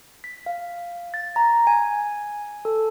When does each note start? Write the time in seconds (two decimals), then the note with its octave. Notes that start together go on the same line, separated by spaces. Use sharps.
0.24 B6
0.46 F5
1.14 A6
1.36 A#5
1.67 G#5
2.65 A4